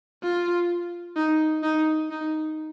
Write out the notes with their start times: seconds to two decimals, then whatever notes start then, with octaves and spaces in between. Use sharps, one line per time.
0.23 F4
1.16 D#4
1.63 D#4
2.11 D#4